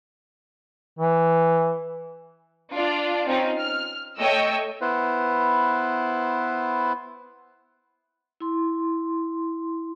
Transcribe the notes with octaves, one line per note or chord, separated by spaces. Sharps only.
E3
D4 F4 D5
C4 C#4 D#4 F4
F6
A3 C#5 D#5 G5 E6
B3 E4 B4 C5
E4 C6